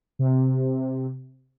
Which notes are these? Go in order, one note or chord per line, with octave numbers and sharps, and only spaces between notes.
C3